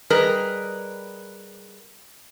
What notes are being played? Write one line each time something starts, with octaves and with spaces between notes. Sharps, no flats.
G3 G#4 A#4 B4 D#5